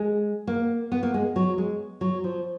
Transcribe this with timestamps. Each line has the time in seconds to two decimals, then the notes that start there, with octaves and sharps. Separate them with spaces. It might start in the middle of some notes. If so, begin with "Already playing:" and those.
Already playing: G#3
0.47 A#3
0.92 B3
1.03 A#3
1.14 G#3
1.36 F#3
1.58 G#3
2.01 F#3
2.24 F3